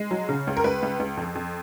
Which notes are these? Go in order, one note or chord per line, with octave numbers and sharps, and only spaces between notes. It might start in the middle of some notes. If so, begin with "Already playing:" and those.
Already playing: G#3
F#3
C#3
C#2
A#4
C#2 B4
C#2
C#2
F2
F2